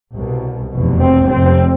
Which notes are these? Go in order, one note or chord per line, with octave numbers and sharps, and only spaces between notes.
C2 B2
F1 E2 B2
C4
F1 F2 C3 C4